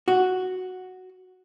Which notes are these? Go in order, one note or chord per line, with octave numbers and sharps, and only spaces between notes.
F#4